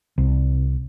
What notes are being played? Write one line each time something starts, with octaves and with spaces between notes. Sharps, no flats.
C2